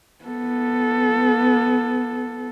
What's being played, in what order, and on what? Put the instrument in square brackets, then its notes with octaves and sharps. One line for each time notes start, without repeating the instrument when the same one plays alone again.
[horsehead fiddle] B3 A4